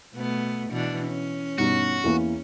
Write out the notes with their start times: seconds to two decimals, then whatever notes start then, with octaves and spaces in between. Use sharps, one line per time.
0.14 B2 A3 B3
0.69 B2 E3 D4
1.08 C#4
1.58 G2 B2 D#4 F#4
2.04 E2 E3 A#3